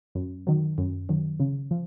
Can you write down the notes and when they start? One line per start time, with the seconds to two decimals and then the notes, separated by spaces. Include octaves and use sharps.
0.15 F#2
0.47 D#3 F#3
0.78 F#2
1.09 D#3 F#3
1.40 C#3
1.71 F3